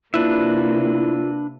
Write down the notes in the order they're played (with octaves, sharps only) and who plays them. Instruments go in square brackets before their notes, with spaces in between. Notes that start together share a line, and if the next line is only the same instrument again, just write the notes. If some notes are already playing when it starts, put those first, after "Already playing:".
[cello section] C3 A#3 [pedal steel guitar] D4 B4 E5 [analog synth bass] E4 [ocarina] F4